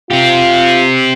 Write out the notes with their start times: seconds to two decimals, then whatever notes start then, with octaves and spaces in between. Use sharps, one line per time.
0.11 C4 F4 G4